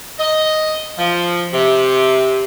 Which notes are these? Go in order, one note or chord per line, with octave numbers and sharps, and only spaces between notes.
D#5
F3
C3